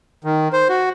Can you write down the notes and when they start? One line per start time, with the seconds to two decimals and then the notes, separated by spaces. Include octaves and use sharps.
0.24 D#3
0.53 C5
0.69 F#4